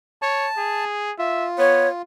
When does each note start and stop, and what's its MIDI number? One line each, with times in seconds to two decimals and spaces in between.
0.22 0.48 73
0.22 0.84 81
0.57 1.12 68
1.18 2.02 65
1.18 1.47 76
1.58 1.88 59
1.58 1.88 73